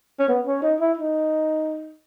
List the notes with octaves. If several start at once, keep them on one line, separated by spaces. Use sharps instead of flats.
C#4
B3
C#4
D#4
E4
D#4